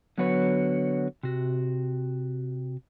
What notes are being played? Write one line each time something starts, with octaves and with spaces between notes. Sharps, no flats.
D3 F#3 B3 F#4 B4 C#5
C3 F#4